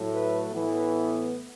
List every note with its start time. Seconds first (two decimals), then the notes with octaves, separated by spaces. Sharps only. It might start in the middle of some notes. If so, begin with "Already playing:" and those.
Already playing: A2 F#3 A3
0.13 B4
0.53 A2 E3 B3